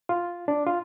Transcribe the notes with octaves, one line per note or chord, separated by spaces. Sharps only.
F4
D4
F4